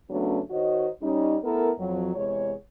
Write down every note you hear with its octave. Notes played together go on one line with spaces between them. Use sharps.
C#3 F#3 A3 B3 C#4 D4
D#3 F#4 C5 C#5 D#5
G3 C#4 D#4
A3 B3 E4 A4 A#4
F2 F#3
E2 C3 G#3 C#5